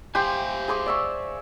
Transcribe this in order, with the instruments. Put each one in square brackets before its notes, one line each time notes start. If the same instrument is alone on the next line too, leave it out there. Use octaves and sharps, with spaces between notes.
[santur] G4 G5 C6 [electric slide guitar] C5 F5 G#5
[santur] G#4 C6 D6
D5 E5 C#6